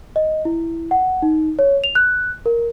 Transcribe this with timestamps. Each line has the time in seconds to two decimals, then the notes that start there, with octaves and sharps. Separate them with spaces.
0.16 D#5
0.45 E4
0.91 F#5
1.22 D#4
1.59 C#5
1.84 F7
1.95 F#6
2.46 A#4